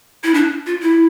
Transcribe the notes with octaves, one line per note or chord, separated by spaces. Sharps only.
E4
D4
F4
E4